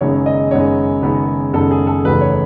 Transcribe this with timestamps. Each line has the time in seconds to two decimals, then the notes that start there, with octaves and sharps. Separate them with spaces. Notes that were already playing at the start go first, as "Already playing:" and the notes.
0.01 F#1 F#2 D#3 G#3 B3 C#5
0.26 D#5
0.51 F#1 F#2 D#3 G#3 B3 C#5
1.02 F#1 F#2 D#3 G#3 B3
1.53 F#1 F#2 D#3 G#3 B3 A4
1.71 G#4
1.87 A4
2.04 F#1 E2 D#3 A3 B4
2.21 C#5